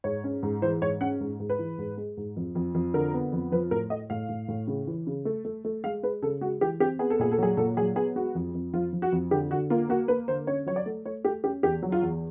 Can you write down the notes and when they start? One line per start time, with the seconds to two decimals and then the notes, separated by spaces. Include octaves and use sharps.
0.04 G#2 C#5
0.24 C#4
0.43 G#2
0.62 E3 C5
0.82 G#2 C#5
1.01 C#4 F#5
1.20 G#2
1.40 G#2
1.50 B4
1.59 E3
1.78 G#2
1.97 G#3
2.17 G#2
2.36 F2
2.55 F2
2.75 F2
2.94 D3 A#4
3.13 B3
3.32 F2
3.52 F3 B4
3.71 A2 A#4
3.90 A3 D#5
4.10 A2 F5
4.29 A2
4.48 A2
4.68 C#3
4.87 E3
5.07 C#3
5.25 A3
5.45 A3
5.65 A3
5.84 G#3 F5
6.03 G#3 B4
6.22 C#3 A4
6.41 G#3 F#4
6.61 E3 G4
6.80 C4 G4
6.99 B3 G#4
7.10 A4
7.19 A#2 G#4
7.32 A4
7.38 F#3 G#4
7.57 A#2 A4
7.77 F#3 G#4
7.96 B3 G#4
8.15 G#3 F#4
8.35 F2
8.54 F2
8.73 F3 F4
8.93 F3
9.02 F#4
9.12 F2
9.31 D3 G4
9.50 D3 F#4
9.70 A#3 F4
9.89 A#3 F#4
10.08 A#3 B4
10.28 D3 C5
10.47 C#4 C#5
10.66 F#3 C#5
10.76 D5
10.86 A3
11.05 A3 C#5
11.25 A3 G4
11.44 C#4 G4
11.63 E2 G4
11.82 F#3
11.92 F4
12.02 E2